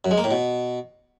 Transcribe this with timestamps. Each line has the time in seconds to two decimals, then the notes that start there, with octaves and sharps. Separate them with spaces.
0.05 F#2
0.11 G#3
0.18 A#3
0.24 A2
0.31 B2